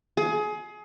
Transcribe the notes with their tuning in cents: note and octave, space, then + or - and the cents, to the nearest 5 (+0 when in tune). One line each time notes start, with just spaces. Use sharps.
G#4 +25